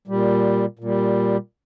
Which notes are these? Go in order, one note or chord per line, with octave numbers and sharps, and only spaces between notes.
A#2 G3
A#2 G3